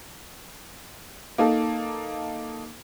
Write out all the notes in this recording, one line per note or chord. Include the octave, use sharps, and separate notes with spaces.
A#3 D#4 A4